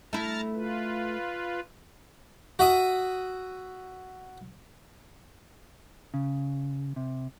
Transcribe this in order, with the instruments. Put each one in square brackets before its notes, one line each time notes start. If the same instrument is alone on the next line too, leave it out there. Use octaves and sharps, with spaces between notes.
[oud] A3 E4 [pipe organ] A5 A#5 F6
[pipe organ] F4 B4
[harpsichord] F#4 E5 D#6
[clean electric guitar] C#3
C3